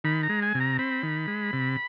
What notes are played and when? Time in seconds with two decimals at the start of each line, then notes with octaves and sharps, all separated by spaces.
0.04 D#3 B5
0.23 A#5
0.29 G#3
0.42 G#5
0.55 C3
0.60 A#5
0.79 C4 B5
1.03 D#3
1.28 G#3
1.53 C3